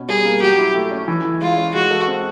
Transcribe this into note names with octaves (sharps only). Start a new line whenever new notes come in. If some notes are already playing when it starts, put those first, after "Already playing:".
Already playing: B2 C#4
G3 G#4
A#3
F#3 G4
E4
A3
C#4
E3
E4
G#3 F4
C#4
G#3 F#4
A4
C4